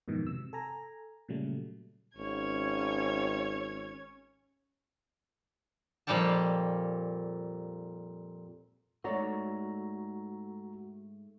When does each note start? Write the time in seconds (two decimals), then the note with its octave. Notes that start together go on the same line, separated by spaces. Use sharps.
0.08 F2 G#2 B2 D#3 E3
0.27 C3 E6
0.53 A4 G#5 A#5
1.28 A#2 C#3 F#3 G3 A3
2.17 G#1 C#4 C#5 G#6
6.07 F2 A#2 G3 F5 G5 A5
9.04 G#2 A3 F#4 C#5 D5 A#5